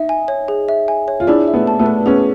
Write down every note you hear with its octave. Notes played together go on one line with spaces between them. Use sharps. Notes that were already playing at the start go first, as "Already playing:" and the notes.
Already playing: D#4 E5
G#5
C#5
G#4
E5
G#5
C#5
F4
D4 E4 G#4
E5
A3 B3
A5
A3 B3
B4
B3 C#4 G#4